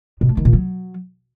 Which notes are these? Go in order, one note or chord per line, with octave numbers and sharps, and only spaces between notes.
B2
A3
D#3
A#2
F#3